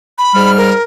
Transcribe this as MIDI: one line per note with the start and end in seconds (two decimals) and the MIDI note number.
0.18 0.52 83
0.35 0.73 44
0.35 0.73 55
0.35 0.73 89
0.58 0.83 70